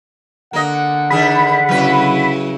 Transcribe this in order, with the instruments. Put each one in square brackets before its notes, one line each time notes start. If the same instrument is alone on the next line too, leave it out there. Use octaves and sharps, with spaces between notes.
[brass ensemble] D3 F#5 [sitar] A#3 D#5
[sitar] D#3 D4 G#4 [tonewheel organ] B5
[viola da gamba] C#3 E4 [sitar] F#3 B4